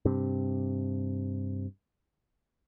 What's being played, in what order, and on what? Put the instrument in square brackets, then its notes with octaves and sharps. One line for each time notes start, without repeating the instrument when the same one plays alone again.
[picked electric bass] G2 C3